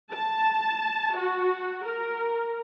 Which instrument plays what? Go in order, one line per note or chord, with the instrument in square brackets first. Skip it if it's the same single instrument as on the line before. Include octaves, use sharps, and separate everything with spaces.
[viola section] A5
F#4
A#4